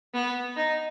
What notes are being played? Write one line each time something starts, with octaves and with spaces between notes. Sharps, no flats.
B3
D#4